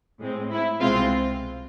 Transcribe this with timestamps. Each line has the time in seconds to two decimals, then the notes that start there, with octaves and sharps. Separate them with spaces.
0.20 A2 G#3 C4
0.50 E4
0.81 C2 B2 G#3 C4 F4